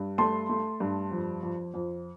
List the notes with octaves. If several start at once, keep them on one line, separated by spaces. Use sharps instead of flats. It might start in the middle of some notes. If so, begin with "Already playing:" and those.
Already playing: G2
A3 A5 C6
A3
G2
F2
F2
F2